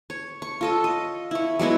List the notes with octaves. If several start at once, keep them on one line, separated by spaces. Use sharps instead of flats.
C#5
C#6
F4 A4 D#5
D#5
E4 C#5
F#3 G#3 B3 E4